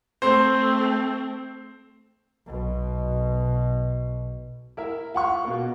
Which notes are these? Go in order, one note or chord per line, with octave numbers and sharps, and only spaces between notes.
A3 C4 C5
B1 B2
E4 A#4 E5
F4 F#5 C#6
B2 A#3